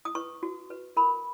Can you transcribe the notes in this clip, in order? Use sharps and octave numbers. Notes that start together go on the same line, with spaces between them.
D#6
B4 C#6
F#4
B4
A#4 B5